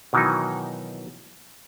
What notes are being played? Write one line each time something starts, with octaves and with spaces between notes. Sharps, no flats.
B2 D#3 E3 F#3 D#4